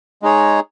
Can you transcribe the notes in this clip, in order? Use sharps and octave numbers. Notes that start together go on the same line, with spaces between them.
G#3 D#4 G#4 C#5